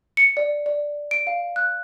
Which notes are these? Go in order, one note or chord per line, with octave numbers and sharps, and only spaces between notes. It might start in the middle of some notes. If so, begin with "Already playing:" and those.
C#7
D5
D5
D7
F5
F#6